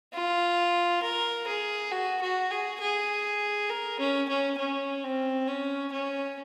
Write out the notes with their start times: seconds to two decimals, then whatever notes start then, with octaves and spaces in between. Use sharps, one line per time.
0.14 F4
1.03 A#4
1.47 G#4
1.91 F#4
2.21 F#4
2.51 G#4
2.81 G#4
3.70 A#4
3.99 C#4
4.29 C#4
4.58 C#4
5.04 C4
5.47 C#4
5.92 C#4